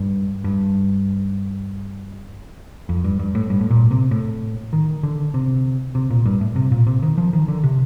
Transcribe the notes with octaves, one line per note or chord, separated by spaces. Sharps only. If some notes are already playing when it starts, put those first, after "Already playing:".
Already playing: G2
G2
F2
G2
G2
A2
G2
A2
A#2
C3
A2
D#3
D3
C3
C3
A#2
G2
A2
C3
A#2
C3
D#3
F3
D#3
D3
C3